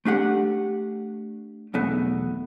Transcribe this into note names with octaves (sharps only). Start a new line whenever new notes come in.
A3 D4 G4 F#5
B1 E2 A3 B3